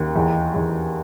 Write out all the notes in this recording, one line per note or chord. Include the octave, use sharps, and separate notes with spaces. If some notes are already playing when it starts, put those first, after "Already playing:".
Already playing: D#2
E2
E2